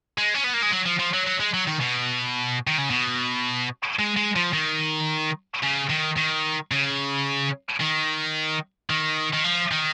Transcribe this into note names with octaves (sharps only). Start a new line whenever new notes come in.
G#3
C#4
B3
A#3
G#3
F#3
F3
F3
F#3
F#3
G#3
F#3
D#3
B2
D#3
C#3
B2
G#3
G#3
F3
D#3
C#3
D#3
D#3
C#3
D#3
D#3
D#3
F3
D#3